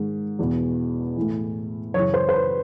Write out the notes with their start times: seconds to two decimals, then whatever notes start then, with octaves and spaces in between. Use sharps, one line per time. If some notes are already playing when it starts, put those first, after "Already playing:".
Already playing: G#2 D#3
0.39 E2 B2
1.17 A2 E3
1.94 F#2 C#3 E3 C#5
2.14 C5
2.29 C5
2.34 B4